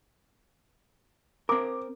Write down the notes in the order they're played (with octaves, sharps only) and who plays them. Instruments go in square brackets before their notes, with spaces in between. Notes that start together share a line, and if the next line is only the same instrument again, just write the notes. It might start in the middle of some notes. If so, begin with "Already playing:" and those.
[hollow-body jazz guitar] C4 A#4 [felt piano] D6